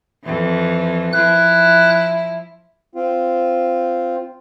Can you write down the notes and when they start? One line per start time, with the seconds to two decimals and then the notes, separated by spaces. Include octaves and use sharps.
0.24 F2 E3
1.13 F3 E4 F#6
2.95 C4 F4